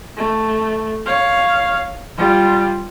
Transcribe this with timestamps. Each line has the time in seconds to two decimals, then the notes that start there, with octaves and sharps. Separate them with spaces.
0.17 A3
1.06 C#5 F5
2.17 G3 F4